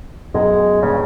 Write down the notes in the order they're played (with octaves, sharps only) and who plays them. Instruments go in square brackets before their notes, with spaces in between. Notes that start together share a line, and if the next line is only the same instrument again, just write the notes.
[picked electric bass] F#2 B2 [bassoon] G#3
[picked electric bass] G1 G2 A#2 [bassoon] C#3